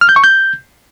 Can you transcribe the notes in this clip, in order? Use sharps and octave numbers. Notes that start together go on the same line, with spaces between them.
F6
G6
C#6
G6